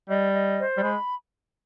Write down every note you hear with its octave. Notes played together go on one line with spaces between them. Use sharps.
G3 D#5
D#5
C5
G3
G#3 B5